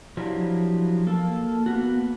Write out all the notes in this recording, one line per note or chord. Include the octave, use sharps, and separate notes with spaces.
F3 F#3 D4 E4 F4 G4
A#3 A4
A#3 B3 F#4